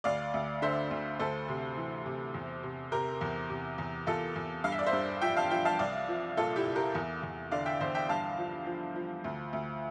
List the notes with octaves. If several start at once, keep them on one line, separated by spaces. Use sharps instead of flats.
D2 D5 F5
D2
D3 C5 E5
D2
D2 A4 C5
C3
E3
C3
E2
C3
C3 G4 A#4
E2
C3
E2
E2 F4 A4
E2
G2 F5
E5
D5
C5 E5
G2
F3 E5 G5
F5 A5
F3 E5 G5
F5 A5
C2 D5 F5
F3
A#2 F4 A4
E4 G4
C2
G4 A#4
E2
E2
D3 D5 F5
E5 G5
E2 C5 E5
E5 G5
G2 F5 A5
F3
F3
F3
D2
D2